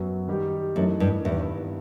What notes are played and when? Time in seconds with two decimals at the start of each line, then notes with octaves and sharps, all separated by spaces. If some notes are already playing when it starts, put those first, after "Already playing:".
Already playing: F#2 F#3 B3 F#4
0.28 D#3 G3 D#4 G4
0.76 F#2 E3 A3 D#4
1.00 G2
1.24 E2 G2 D#3 G3 B3 E4